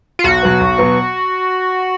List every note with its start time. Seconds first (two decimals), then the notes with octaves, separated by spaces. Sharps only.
0.19 F4
0.24 B1 F#4
0.42 B2 F#3 B3
0.60 B1
0.78 B2 F#3 B3